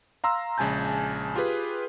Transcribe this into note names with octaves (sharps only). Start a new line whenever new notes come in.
F5 A#5 C6 E6
A#1 C#3 G#3 G#5 A5 G6
F4 G4 G#4 B4